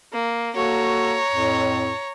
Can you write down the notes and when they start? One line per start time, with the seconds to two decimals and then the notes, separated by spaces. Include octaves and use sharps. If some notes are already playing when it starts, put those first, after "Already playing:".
0.13 A#3
0.56 A#3 F#4 A4 C#5 A#5
1.32 F2 A2